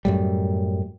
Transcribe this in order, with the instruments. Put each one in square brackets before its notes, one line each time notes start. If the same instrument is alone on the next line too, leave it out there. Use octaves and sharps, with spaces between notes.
[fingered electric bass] F#2 A2 G3